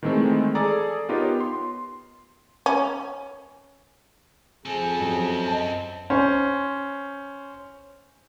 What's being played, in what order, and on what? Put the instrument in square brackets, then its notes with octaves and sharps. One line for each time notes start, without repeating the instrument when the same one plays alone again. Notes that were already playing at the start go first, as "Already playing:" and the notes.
[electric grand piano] D#3 E3 G#3 A3 C4
G#4 A4 D5 A#5
B3 D#4 F4 G4 A#4 C#5
C6
[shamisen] C#4
[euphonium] F2 [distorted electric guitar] C4 A4 [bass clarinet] G#4
[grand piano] F#2
[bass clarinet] F#2 [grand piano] D#5 A5
[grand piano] C#4 C5